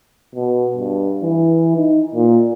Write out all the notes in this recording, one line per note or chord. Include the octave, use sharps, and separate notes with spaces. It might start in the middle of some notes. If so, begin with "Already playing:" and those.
B2
G2
E3
D#4
A#2